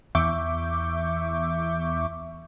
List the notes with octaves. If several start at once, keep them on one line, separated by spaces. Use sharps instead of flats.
E2 E5 C#6 D6 G6